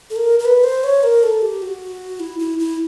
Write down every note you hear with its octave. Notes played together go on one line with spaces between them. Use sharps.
A4
A#4
A#4
B4
C5
C#5
A#4
A4
G4
F#4
E4
E4
E4